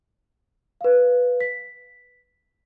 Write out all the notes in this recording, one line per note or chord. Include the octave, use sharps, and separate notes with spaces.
B4 F5
B6